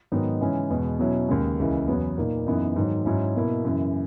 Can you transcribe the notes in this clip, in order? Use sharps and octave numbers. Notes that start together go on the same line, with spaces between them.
G#2 D#3 F#3 B3 D#4
C#3 E3 G#3 C#4 E4
E2 B2 G#3
B2 F#3 C#4 E4
D#2 C#3 G#3
C#2 C#3 E3 A#3
E2 C#3 F#3 B3
A#2 A#3 D#4
F#2 E3 B3 D#4
G#2 D#3 F#3
G#2 F#3 C#4 E4
B2 A#3 E4
F#2 C#3 E3